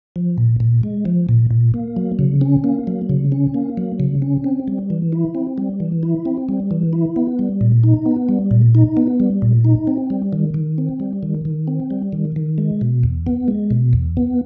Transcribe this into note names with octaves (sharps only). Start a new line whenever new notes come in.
F3
A#2
A#2
G#3
F3
A#2
A#2
A#3
F#3
C#3
C#4
A#3
F#3
C#3
C#4
A#3
F#3
C#3
C#4
C4
G3
E3
E4
C4
G3
E3
E4
C4
G3
E3
E4
B3
G3
A#2
D#4
B3
G3
A#2
D#4
B3
G3
A#2
D#4
C4
G3
D#3
D#3
C4
G3
D#3
D#3
C4
G3
D#3
D#3
G#3
B2
E2
B3
G#3
B2
E2
B3